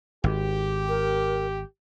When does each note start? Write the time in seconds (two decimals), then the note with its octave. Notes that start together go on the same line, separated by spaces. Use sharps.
0.24 G#1 G4
0.89 A#4